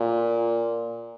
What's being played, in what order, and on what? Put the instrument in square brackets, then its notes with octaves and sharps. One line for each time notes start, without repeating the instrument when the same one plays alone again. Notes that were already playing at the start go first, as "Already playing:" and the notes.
Already playing: [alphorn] A#2